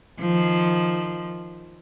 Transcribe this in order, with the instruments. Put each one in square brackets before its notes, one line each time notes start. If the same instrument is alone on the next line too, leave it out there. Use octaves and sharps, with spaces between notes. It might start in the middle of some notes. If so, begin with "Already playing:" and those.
[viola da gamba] D#3 F3